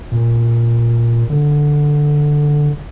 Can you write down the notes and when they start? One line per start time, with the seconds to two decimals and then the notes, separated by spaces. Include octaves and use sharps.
0.12 A#2
1.30 D3